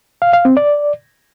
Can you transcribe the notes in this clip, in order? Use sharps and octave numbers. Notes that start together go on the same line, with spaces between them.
F5
F5
C4
D5